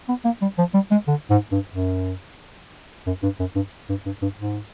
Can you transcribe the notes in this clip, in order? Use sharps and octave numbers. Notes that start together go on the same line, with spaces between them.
B3
A#3
G3
F3
G3
G#3
D3
G#2
G2
F#2
F#2
G2
F#2
G2
G2
G2
G2
G#2